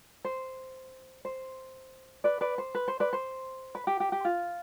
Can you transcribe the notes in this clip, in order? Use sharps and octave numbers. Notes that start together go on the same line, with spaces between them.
C5
C5
B4 D5
B4 D5
C5
B4
C5
B4 D5
C5
B4
G4
G4
G4
F4